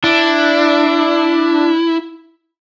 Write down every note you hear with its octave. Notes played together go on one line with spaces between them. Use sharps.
D4 E4